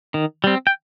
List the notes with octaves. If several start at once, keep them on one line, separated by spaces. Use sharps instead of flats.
D#3
G3 C4
G5